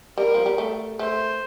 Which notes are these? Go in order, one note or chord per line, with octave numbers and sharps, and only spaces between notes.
G3 A#4
F3
G3
A3
A3 C5